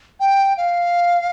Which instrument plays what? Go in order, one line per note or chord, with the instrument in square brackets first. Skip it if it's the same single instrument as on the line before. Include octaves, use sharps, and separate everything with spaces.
[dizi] G5
F5